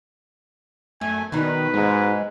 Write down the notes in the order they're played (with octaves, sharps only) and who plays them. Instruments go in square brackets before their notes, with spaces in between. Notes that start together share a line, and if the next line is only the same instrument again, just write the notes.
[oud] F#2 [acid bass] A3 [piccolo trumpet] G#5
[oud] B2 F#3 D#4 [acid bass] D#3 [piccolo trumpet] B4
[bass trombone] G#2 [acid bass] G#3